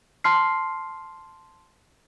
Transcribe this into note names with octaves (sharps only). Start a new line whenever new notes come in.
A5 C6 F6 C7